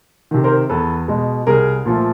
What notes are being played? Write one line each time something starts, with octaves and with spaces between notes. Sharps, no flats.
C3 D#3
A#4 C5
E2 A4 B4
B2 G#3
C2 G#4 A#4
A#2 F3 A3